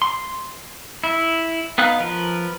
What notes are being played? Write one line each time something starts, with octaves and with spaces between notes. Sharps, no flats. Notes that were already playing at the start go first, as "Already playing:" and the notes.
C6
E4
B3 D#4 F5 F#6
F3 A#4 B4